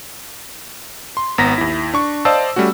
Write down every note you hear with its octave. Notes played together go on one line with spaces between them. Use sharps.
C6
G#1 B3 A#5 A#6 B6
D#2 E4
D4 C#6
C5 D5 D#5 F5 A5 E6
G3 A3 C#4 F#4